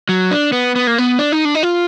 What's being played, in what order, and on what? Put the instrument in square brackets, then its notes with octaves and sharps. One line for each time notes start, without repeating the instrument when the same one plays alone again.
[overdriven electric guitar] F#3
D4
B3
B3
A#3
B3
D4
D#4
D4
D#4
F4